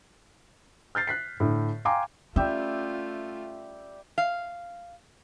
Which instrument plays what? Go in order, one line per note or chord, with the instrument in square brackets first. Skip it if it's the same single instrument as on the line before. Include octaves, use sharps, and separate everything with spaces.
[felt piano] F6 G6 A6 C7
F#6 B6 C7
A2 D3
F5 G5 G#5 A#5 C6 D6
[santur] G3 G4 E5 [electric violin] A3 F4 [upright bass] C#4
[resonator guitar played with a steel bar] F5